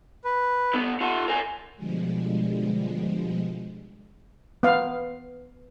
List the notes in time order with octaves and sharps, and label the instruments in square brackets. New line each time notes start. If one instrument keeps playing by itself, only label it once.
[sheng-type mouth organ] B4
[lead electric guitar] D3 B3
[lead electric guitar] F4 F#5 [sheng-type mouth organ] A4
[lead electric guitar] A#4 G#5
[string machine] B2 D3 F3 G3 G#3
[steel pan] B3 F5